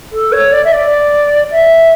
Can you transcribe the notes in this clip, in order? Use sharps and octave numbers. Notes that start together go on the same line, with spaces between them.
A4
C#5
D5
E5
D5
E5